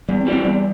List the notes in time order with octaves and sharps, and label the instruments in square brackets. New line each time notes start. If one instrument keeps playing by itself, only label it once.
[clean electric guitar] E2 [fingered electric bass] G3
[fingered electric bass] C4
[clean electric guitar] E3 G3
[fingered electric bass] C4
[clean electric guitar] E2 [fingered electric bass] G3